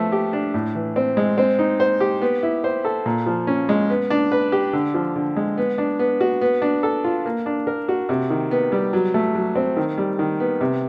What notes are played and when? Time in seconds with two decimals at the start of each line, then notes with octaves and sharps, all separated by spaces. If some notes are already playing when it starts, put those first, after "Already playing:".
Already playing: F3 A3 B3
0.12 G4
0.33 D4
0.54 A2
0.75 E3
0.96 C4
1.17 G#3
1.38 C4
1.59 D#4
1.80 C5
2.00 G4
2.21 B3
2.43 E4
2.64 C5
2.85 A4
3.06 A#2
3.26 F3
3.47 C#4
3.69 G#3
3.90 B3
4.10 D4
4.32 B4
4.52 G4
4.73 D3
4.94 F3
5.16 D3
5.36 G#3
5.58 B3
5.78 D4
5.99 B3
6.21 F#4
6.41 B3
6.62 D4
6.83 A4
7.04 F4
7.25 A#3
7.46 D4
7.67 A#4
7.89 F#4
8.09 C3
8.30 D#3
8.51 B3
8.72 G3
8.93 F#3
9.14 A3
9.35 F#3
9.56 C4
9.77 D#3
9.98 G3
10.19 D#3
10.40 B3
10.61 C3